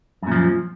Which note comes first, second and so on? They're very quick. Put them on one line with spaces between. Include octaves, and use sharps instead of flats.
F#2 A#2 F3